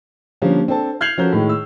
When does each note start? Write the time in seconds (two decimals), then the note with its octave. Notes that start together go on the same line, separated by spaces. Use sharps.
0.42 D3 F3 G3 A#3 C#4
0.68 C4 D4 A4 A5
1.01 F6 G6 G#6 C7 F7 F#7
1.18 F3 C#4 F#4 A4 A#4 G6
1.32 A2 D#3 G#3
1.49 E6